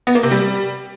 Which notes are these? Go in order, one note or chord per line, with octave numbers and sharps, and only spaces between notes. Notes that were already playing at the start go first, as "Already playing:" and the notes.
B3
A#3
C3
G3